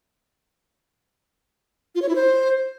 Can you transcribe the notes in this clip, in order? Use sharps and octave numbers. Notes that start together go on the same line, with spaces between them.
F4
C#5
E4
C5